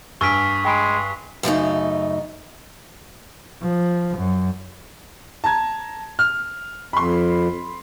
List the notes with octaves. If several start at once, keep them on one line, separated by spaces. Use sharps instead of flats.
G2 G#5 C#6 E6 F6 B6 D7
G#3 G5 B5 D7
F#2 C#3 A3 D#4
F3
F#2
A5 A#5 G#6
F6
F2 B5 C6